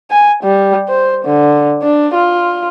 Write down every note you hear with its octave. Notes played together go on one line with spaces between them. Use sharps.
G#5
G3
C5
D3
D4
F4